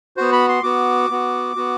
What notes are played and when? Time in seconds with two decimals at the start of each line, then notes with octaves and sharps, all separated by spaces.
0.17 B3 F#4 C5
0.32 B5
0.49 C6
0.63 B3 F#4 D6
1.10 B3 F#4
1.56 B3 F#4